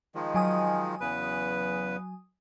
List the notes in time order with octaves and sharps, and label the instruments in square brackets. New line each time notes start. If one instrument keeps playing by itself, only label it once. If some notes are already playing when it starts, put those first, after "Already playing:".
[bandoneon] D#3 F3 G#3
[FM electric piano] F#3 G#5 D#6
[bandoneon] E2 C#3 B4